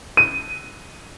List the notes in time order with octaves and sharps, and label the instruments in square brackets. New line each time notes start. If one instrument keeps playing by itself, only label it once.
[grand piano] D#7